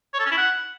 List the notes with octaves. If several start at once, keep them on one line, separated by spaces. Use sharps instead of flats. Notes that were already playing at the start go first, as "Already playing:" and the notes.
C#5
A4
C#4
E4
F#5